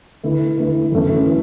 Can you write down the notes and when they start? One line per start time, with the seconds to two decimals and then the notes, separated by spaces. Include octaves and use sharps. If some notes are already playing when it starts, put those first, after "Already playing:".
0.23 D3 A3 E4 B4
0.58 D3 A3 E4 B4
0.92 F#2 E3 A3 C#4
1.27 E3